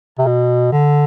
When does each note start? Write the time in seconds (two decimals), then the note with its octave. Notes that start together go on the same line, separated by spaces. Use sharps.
0.18 C3
0.26 B2
0.72 D3